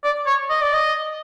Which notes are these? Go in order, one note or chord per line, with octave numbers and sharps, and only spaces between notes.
D5
C#5
D#5
D5
D#5